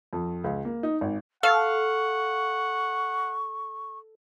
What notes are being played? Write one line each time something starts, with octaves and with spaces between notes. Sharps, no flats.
F2
C#2
A#3
D#4
G#1
A4 F5 F#5 C#6